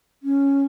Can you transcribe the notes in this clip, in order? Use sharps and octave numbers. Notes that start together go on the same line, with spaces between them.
C#4